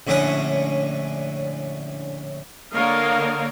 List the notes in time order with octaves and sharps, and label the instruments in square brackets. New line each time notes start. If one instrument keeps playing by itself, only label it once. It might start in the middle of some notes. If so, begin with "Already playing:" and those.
[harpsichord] A#1 A2 D3 C#4 F#5 D#6
[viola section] D3 A#3 A#4 C#5 D#5 F5